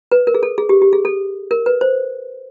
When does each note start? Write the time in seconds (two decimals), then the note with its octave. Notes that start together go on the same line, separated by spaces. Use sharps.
0.12 B4
0.27 A#4
0.34 G#4
0.43 A4
0.58 G#4
0.69 G4
0.82 G4
0.93 G#4
1.05 A4
1.51 A#4
1.66 B4
1.81 C5